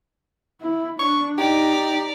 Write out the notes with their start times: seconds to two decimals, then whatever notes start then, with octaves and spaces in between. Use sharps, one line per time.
0.62 E4
0.99 D4 C#6
1.38 D#4 G4 D5 A#5